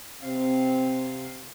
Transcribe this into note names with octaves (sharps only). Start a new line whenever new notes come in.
C3 C4 F5